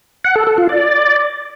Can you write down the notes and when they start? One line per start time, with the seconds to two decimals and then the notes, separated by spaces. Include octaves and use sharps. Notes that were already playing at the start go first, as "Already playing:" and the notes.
0.24 F#5
0.36 A4
0.47 A4
0.58 F4
0.69 D5